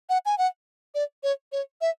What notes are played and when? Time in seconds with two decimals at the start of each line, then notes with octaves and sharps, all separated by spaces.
0.09 F#5
0.26 G#5
0.38 F#5
0.95 D5
1.23 C#5
1.52 C#5
1.81 E5